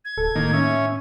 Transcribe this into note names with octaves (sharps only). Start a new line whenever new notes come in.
G#6
D1 A4
A2 D#3 A#3 D#4
C#4 E5